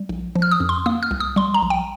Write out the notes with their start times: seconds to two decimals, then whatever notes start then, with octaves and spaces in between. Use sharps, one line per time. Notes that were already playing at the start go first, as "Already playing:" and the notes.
Already playing: G3
0.09 A#1
0.36 F3
0.42 F6
0.51 D#6
0.60 F2
0.69 C6
0.86 A#3 D#6
1.03 F6
1.11 C2
1.20 D#6
1.36 G3 C6
1.54 A#5
1.62 A#1
1.70 G5